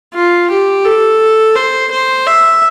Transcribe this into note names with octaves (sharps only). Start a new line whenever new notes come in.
F4
G4
A4
C5
C5
E5